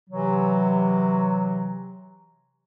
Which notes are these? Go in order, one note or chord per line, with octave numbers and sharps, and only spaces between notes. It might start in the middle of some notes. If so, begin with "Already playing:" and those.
C3 E3 F#3